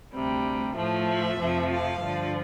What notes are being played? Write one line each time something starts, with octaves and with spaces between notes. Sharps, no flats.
D2 C3 G3
A2 F3 A3
E5
F2 C3 F3 A3
F5
G2 D3 F3